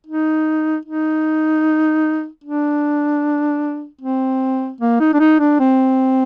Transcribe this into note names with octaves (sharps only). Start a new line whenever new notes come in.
D#4
D#4
D4
C4
A#3
D#4
D4
D#4
D4
C4